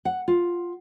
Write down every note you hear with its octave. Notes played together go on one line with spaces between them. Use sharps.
F#5
F4